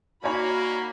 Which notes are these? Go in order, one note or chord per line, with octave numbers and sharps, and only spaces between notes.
A#3 D#4 F#4 C#5 D5 G#5 B5 G#6